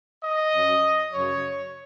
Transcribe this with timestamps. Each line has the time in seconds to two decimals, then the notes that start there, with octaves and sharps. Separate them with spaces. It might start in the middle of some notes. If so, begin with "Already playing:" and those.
0.22 D#5
0.52 F#2 F#3 C#4
1.12 F#2 C#3 F#3 C#5